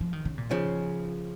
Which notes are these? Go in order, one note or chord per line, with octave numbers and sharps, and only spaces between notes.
F3
D#3
C#3
A#2
C#3 F3